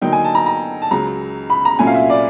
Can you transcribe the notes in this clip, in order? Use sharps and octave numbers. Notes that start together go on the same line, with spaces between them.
D3 F#3 A#3 D#4 G5
G#5
A5
A#5
A#5
A5
C#2 C#3 F#3 A#5
B5
A#5
C2 A#2 F#3 A3 C#4 G#5
F5
E5
D5